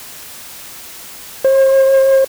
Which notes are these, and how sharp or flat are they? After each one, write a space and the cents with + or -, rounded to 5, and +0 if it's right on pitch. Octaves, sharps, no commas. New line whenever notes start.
C5 +45